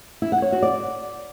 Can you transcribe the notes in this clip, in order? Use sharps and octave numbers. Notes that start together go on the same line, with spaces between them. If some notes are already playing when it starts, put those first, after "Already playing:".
E4
F#5
C#5
F#4
D5